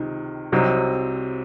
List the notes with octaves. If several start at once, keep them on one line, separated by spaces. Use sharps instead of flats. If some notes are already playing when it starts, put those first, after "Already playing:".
Already playing: C#2 C3 D#3
C2 C3 F#3 C4 D#4